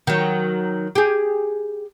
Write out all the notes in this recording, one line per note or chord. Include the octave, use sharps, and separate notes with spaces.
D#3 F#3
G4 G#4